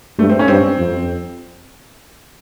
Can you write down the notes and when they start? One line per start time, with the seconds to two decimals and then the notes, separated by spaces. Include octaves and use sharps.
0.18 G2 A3
0.30 C4
0.39 C#4
0.48 G2 C4
0.78 F2